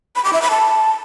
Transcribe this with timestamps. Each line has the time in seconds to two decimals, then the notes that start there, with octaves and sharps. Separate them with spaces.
0.16 B5
0.24 D6
0.33 E5
0.42 B5
0.51 A5